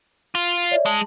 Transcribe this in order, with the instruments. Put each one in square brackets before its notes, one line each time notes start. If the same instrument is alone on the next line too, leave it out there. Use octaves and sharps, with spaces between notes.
[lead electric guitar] F4
[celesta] C#5 D5 E5
[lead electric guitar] G#3 [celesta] A5 F#7